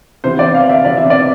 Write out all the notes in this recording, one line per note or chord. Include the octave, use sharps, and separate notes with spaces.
C3 E3 B3 C5
D5
F5
E5
C3 E3 B3 D5
E5
D5